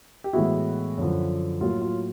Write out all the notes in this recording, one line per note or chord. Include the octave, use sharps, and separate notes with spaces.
G4
A2 E3 G#3 B3 E4 F#4
F#2 D3 F3
A2 F#3 A#3 F4
F4